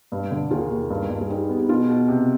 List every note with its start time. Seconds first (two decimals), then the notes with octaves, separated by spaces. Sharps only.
0.12 G2
0.31 D3
0.51 D#2 F4 G#4
0.70 D#2
0.90 G2
1.10 G2
1.21 G#4
1.30 G3 D#4 G4
1.49 B3
1.59 G4
1.69 B2 F4 G#4
1.89 B2
2.08 C3